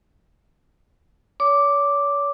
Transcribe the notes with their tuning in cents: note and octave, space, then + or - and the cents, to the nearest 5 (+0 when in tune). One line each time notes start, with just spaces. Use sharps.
C#5 +35 D6 +0